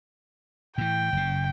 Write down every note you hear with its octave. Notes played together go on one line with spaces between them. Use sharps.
A2 E3 G5
F#1 C#3